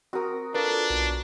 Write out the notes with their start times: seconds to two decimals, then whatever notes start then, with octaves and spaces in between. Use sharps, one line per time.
0.13 C4 F#4 A#4 D#6
0.54 A#3 D4 F4 A4 B4
0.90 B1